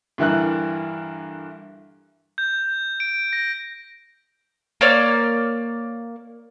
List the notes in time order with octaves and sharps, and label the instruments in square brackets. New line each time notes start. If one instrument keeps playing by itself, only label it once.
[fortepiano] G2 D3 E3 E4 A#4 F#6
[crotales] G6
D7
A#6
[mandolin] A#3 C#5 D5 F6